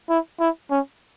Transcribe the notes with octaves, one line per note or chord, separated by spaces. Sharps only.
E4
E4
C#4